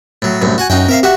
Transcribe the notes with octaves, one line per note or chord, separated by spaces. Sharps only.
A2 F#3
C2 F#2 A2
F#4 F#5 G#5
F#2 C#4 D#4 F#4 G5
C4 A#4 E5 F5
F#4 G4 E5 F#5